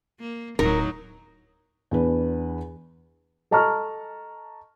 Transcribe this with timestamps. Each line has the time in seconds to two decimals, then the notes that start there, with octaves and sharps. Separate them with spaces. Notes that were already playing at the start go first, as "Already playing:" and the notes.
0.20 A#3
0.59 D1 A2 F#3 D#4 A#4
1.91 E2 D4 B4
3.51 A4 D#5 A5 A#5 C#6 F6